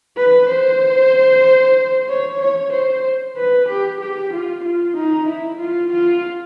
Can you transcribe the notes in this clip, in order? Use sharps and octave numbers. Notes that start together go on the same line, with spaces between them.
B4
C5
C#5
C#5
C5
B4
G4
G4
F4
F4
D#4
E4
F4
F4